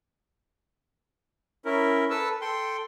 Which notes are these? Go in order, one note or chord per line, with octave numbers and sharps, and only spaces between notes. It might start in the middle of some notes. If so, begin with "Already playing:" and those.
C#4 E4 A#4
A4 B4 A5 E6
A4 G5 C6